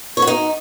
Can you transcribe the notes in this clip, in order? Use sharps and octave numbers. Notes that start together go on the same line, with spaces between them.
C#5
F#4
D#4